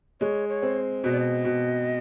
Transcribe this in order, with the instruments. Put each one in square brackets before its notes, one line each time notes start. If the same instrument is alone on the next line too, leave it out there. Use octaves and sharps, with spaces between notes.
[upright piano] G#3 [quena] C#5
[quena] C#5
[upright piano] C4
[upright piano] B2 [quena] D#5
[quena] D5
D#5
[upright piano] B2